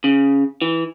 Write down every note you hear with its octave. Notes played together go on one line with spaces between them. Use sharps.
C#3
E3